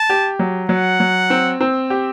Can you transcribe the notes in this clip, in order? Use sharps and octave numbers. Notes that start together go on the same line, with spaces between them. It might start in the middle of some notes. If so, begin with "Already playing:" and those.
Already playing: A5
G4
F#3
F#3 F#5
F#3
C4
C4
G4